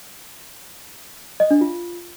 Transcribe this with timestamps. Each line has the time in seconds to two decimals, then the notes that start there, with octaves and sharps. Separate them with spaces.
1.40 D#5
1.51 D4
1.61 F4